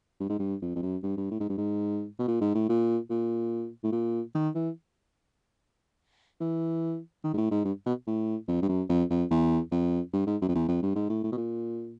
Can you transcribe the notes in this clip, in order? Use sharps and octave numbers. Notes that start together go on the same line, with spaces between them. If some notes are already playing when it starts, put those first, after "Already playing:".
G2
G#2
G2
F2
F2
F#2
G2
G2
A2
G#2
G2
G#2
B2
A#2
G#2
A2
A#2
A#2
A2
A#2
D#3
E3
E3
D#3
G#2
A2
G#2
G2
B2
A2
F2
G2
F#2
F2
F2
E2
F2
G2
G#2
F#2
F2
E2
F2
G2
G#2
A2
A2
B2
A#2